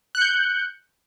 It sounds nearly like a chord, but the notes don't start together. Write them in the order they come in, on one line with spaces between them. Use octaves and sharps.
F#6 C#7 G6